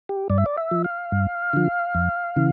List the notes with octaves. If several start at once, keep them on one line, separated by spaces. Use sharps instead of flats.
G4
G2 D5
E5
D5
E5
F3
F5
G2
D3 F3
F2
C#3 E3